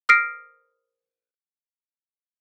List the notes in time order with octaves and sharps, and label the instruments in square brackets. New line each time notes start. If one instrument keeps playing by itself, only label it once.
[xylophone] D#6 F6 A#6 C7 D7